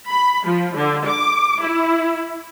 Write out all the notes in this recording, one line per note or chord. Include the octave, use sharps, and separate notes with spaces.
B5
F3
D3
D6
E4